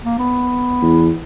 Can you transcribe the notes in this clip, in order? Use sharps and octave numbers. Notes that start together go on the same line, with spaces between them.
A#3
B3
E2